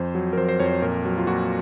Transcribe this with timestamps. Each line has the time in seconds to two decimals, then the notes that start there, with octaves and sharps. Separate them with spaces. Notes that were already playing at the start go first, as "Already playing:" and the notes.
Already playing: F2 C5
0.15 F#3
0.33 A#4
0.37 F2 C5
0.49 C5
0.60 F2 C#5
0.71 C#5
0.82 A#2 A#4
1.05 F#3
1.18 F4
1.27 A#2 F#4